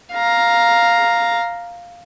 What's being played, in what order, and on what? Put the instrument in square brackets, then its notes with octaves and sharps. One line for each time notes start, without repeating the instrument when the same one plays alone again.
[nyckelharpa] F5 A#5